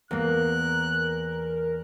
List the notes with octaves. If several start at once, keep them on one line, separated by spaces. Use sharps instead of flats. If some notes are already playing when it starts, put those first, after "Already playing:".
E2 A#3 A#4 F#6